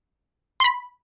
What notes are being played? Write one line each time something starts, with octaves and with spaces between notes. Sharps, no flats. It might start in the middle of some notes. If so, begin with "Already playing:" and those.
C6
B5